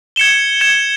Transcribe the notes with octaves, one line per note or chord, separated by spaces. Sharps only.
G#6 C#7 E7 G7
G#6 C#7 E7 G7